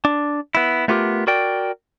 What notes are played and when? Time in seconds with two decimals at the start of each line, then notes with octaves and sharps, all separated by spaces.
0.05 D4
0.55 B3 E4
0.88 A3 B3 F4 G4 A4 A#4
1.27 F#4 A#4 D5 G5